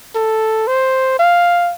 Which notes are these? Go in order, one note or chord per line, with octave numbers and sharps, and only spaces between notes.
A4
C5
F5